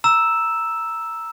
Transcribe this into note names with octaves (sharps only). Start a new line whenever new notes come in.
A#5 E6 E7